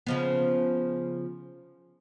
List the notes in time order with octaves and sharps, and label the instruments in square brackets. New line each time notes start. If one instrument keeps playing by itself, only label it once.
[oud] C#3 F3 B3